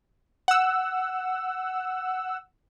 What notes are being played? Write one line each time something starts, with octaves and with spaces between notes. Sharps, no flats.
F#5 E6